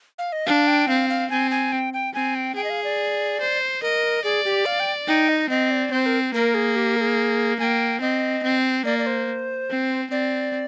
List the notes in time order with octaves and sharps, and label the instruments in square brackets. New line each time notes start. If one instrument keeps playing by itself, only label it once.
[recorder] F5
D#5
[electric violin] D4 [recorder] F5
[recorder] G5
[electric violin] C4 [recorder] F5
[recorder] F5
[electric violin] C4 [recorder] G#5
[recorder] G#5
G5
G5
[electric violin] C4 [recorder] G#5
[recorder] G5
[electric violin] G#4 [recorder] G5
[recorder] D#5
F5
D5
[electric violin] C5
[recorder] A#4 [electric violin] D#5
[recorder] G#4 [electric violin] D5
[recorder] G4
F5
G5
[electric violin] D#4 [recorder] G5
[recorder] D#5
[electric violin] C4 [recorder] D#5
[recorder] D5
[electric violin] C4 [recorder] C5
[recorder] A#4
[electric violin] A#3 [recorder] A#4
[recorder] G#4
G4
A#4
G#4
[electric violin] A#3 [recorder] G5 G#5
[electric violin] C4 [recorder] D#5
[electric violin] C4
[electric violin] A#3 [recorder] D5
[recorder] D5
C5
[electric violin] C4
[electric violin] C4 [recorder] D5